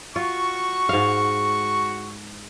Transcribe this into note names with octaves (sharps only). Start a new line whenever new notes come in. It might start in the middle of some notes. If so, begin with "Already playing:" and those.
F4 F#4 C#6
G#2 F5